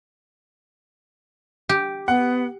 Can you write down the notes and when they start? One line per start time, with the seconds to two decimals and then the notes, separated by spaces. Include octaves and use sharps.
1.69 G4
2.08 B3 F#5